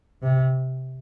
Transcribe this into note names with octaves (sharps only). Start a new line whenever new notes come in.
C3